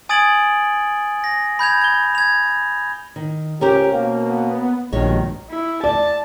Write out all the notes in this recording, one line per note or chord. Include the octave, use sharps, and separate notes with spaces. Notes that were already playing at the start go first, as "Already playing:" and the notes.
G#5 D#6 G#6 A6 D7 F#7
A#6
B5 G6 G#6 F7
G#6 G7
G#6 F7
D#3
C#2 C#4 G4 A#4 C5
B2 A#3
B3
A#1 G2 B2 D#3 G#3 C#5
E4
D5 A5